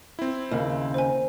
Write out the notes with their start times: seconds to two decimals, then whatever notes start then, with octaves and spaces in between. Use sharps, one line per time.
0.19 C4 E4
0.51 D#2 C#3
0.94 C5 G#5